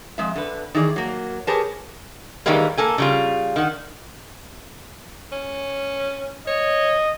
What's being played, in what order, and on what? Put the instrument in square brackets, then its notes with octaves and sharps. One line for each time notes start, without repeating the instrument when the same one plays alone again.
[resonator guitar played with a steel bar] F2 G#3 E5
D3 B4
D#3 E3 G#4 D5
F#3 A#3
G4 G#4 A#4 B4 C#5 A5
D#3 E3 G3 G#3 A#3
A#3 A4 G#5
C#3 G3 F4
D#3 F#5
[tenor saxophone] C#4
[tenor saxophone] C#5 [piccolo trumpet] D#5